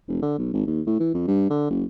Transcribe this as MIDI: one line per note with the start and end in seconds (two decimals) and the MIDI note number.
0.08 0.22 29
0.22 0.36 50
0.38 0.52 35
0.53 0.64 32
0.67 0.81 39
0.86 0.99 45
1.00 1.13 52
1.14 1.25 41
1.28 1.49 43
1.50 1.69 50
1.70 1.84 30